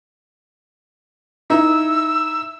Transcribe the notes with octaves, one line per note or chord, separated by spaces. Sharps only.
D#4 E4 E6